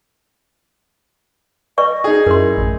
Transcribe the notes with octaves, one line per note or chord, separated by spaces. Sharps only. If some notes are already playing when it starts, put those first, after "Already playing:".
B4 D5 D#5 C#6
D#4 G#4
F#2 E4 A#4 C6
A1